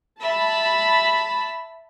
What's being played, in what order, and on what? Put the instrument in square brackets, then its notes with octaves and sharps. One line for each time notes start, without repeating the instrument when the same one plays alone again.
[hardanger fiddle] E5 [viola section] A5 B5